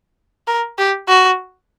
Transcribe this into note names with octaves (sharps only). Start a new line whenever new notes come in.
A#4
G4
F#4